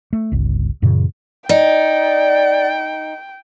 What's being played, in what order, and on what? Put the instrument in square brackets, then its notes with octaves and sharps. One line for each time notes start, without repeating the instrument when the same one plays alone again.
[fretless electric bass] A3
G1 C#2
F#2 A#2 C#3 E3
[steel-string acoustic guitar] D#4 [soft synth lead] D5 [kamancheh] G5